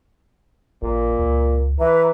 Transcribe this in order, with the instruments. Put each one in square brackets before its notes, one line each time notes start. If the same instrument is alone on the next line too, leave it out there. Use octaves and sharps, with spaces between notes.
[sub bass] A1 [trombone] A#2
[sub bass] C#2
[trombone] E3 [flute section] B4 E5 A#5